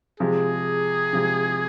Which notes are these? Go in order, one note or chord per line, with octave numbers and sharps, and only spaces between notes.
C3 F3 G#3 G#4
C3 F3 G#3